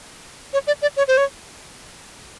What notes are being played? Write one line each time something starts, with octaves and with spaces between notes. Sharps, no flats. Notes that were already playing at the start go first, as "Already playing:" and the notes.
C#5
D5
D5
C#5
C5
C#5